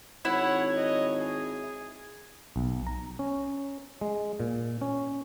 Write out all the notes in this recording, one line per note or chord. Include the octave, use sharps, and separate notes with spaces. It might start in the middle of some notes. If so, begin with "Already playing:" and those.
G#1 E4 C#5 F#5
D#5
G#4
B1
A#5
C#4
G#3
A#2
C#4